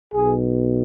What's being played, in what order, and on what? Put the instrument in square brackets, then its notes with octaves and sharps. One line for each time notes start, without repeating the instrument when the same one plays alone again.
[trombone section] B1 B2 G#4